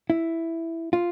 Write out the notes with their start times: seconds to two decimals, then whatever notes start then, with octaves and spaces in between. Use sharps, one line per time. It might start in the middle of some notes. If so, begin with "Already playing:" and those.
0.10 E4
0.93 F4